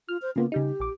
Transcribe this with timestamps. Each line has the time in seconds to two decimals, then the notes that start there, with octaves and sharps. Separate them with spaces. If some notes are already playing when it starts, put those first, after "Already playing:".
0.09 F4 F6
0.22 C5
0.36 C#3 A#3 B3 F4
0.52 C#3 G3 D#4 G4
0.80 A#1 D6